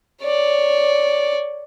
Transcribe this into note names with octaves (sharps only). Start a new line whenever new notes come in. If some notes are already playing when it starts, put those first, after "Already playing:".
C#5 D5